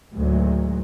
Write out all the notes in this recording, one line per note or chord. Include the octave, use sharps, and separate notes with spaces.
D2 A2 D#3 F#3 G#3